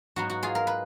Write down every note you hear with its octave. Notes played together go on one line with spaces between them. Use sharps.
G#2 F#3 B3 D#4 F#4
F#4
F4 G#4
A#4
B4